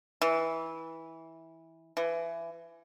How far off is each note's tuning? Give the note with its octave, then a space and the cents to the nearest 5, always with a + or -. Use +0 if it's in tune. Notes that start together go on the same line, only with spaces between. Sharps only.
E3 -15
E3 +25